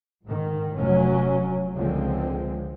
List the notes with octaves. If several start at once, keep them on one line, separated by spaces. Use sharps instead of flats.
G#2 D#3
F1 F#3 C#4
C#2 D3 F3 G#3 C4